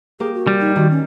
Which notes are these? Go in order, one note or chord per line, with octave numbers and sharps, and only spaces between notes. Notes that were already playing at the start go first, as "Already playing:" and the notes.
A#3 G4 G#4
F#4
G3
D#4
D#3 F#4
C#4